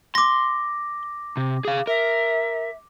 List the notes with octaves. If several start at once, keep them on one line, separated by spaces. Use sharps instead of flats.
C6 D6 A#6
C3
G#4 F5
A#4 E5